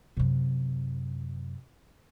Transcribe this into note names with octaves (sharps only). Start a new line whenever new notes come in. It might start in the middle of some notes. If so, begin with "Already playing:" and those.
F#2 C3